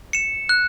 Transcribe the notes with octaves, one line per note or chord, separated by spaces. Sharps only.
C#7 E7
F#6